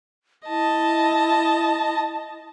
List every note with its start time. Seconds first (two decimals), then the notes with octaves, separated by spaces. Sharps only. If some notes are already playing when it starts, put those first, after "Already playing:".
0.47 E4 D#5 A5